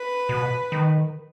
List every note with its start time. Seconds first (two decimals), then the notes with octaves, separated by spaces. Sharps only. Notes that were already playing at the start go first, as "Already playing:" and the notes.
Already playing: B4
0.29 B2
0.72 D#3